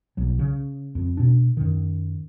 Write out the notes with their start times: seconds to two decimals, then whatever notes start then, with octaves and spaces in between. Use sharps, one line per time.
0.17 B1 F#3
0.39 C#3
0.95 F2
1.17 B2 D4
1.57 F#2 D#3